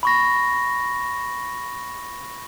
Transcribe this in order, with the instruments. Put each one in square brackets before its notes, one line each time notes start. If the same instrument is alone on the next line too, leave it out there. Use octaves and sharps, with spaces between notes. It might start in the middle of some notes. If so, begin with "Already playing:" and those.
[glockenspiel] B5 C#6 A#6